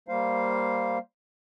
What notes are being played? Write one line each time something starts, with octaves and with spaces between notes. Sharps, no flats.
G3 A#3 C5 F5